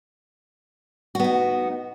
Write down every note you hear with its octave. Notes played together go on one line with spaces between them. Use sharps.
B3 D#4 F#4